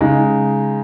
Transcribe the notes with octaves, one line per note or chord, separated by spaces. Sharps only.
C#3 G#3 D#4